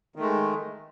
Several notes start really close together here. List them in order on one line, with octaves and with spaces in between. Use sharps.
D#3 A3 G#3